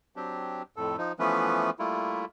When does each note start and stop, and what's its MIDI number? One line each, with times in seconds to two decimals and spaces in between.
0.16 0.62 54
0.16 0.62 60
0.16 0.62 62
0.16 0.62 67
0.76 0.96 41
0.76 0.96 45
0.76 0.96 69
0.98 1.12 53
0.98 1.12 63
1.19 1.70 52
1.19 1.70 53
1.19 1.70 57
1.19 1.70 59
1.19 1.70 61
1.19 1.70 71
1.79 2.25 55
1.79 2.25 57
1.79 2.25 58
1.79 2.25 64
1.79 2.25 65